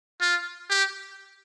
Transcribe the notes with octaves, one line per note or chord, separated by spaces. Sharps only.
F4
G4